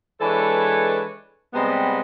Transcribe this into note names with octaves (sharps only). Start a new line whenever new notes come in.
E3 G#3 D4 A4 B4 C#5
C3 G3 G#3 B3